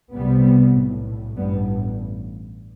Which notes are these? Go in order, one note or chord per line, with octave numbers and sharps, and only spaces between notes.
C2 C3 G3 B3
B1 A2
A1 G2 G3 B3